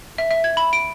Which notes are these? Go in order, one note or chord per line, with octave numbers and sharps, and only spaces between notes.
E5
E5
G#6
B5
D7